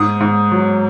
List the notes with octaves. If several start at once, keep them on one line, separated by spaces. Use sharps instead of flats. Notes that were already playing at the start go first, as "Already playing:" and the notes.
Already playing: G#2 D#6
G#2
F#3